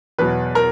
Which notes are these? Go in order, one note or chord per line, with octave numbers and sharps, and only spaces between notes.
E2 B2 F#3 B4
A#4